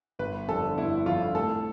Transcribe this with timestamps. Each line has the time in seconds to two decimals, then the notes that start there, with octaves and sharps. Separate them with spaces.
0.19 G1 B4
0.48 F2 D3 A4
0.78 G1 E4
1.06 F2 D3 F4
1.35 A2 A4